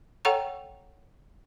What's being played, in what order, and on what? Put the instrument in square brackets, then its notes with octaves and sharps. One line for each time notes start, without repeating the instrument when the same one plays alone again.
[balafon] A4 C#5 F#5 G5 A#5 C#6